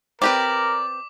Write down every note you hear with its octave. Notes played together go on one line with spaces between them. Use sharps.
C4 G4 A#4 B4 D5 D6